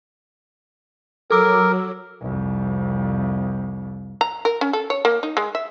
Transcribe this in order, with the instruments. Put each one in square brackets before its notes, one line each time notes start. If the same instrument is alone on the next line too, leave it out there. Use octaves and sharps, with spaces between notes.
[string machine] F#3 [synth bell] A4 D6 E6 [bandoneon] A#4
[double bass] C2 F2
[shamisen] A#5
A#4
C#4
A4
C#5
A#3
D#4
G#3
E5